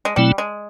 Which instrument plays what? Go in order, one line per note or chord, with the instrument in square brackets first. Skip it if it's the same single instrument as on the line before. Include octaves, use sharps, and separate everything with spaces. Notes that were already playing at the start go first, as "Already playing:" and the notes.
[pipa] G#3
[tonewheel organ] B2 F#3 A3 C4 E4 [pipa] G3
[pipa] G#3